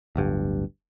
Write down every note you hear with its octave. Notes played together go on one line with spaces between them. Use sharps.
D1 G1 G2